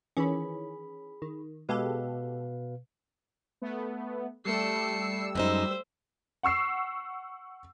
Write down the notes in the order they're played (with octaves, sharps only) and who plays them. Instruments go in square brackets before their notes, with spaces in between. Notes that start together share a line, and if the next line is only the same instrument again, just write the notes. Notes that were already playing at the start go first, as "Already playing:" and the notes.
[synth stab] D#3 E3 C#4 [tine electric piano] G#4 B5
[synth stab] D#3
[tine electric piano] B2 B4 F5 [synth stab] G#3 G4 A4
[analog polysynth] A3 B3
[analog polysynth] G3 E6 [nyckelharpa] A3 [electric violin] C7 C#7
[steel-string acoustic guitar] F#2 G#3 D#4 [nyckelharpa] C5 [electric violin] E5
[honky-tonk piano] F#5 C#6 E6 C7